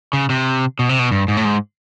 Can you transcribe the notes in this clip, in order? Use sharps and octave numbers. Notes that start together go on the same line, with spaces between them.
C#3
C3
B2
C3
B2
G2
G#2
A2
G#2